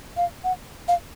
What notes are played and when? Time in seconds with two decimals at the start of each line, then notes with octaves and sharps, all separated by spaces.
0.17 F5
0.44 F#5
0.88 F5